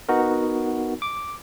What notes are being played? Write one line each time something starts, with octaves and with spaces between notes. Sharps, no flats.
B3 D#4 F#4 A#4
D6